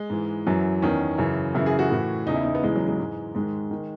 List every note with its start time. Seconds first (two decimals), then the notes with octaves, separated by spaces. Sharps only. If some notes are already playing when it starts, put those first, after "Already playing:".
Already playing: G#3
0.10 G#2 E3
0.47 F#2 E3 F#3
0.82 E2 D#3 C#4
1.18 F#2 C#3 E3
1.55 F#2 C#3 E3 E4
1.66 G#4
1.79 F#4
1.91 A2 E3
2.27 E2 C#3 E3 D#4
2.36 E4
2.45 D#4
2.55 B3
2.63 E2 C#3 E3 G#3
2.75 F#3
2.87 G#3
3.00 G#2 E3
3.35 G#2 D#3 G#3
3.71 D#3